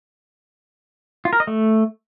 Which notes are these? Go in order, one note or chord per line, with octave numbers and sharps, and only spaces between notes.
F4
A#4
D#5
A3